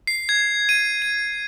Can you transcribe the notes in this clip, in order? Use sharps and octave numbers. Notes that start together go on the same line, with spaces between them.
C7
G#6
D#7
D#7